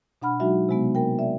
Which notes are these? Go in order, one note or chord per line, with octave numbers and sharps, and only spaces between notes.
B2 D4 F#5 B5 F6
F#3 G#3 D#4 F#4 E5
C3 G#3 B3
A#3 A#4 G5
D5 E5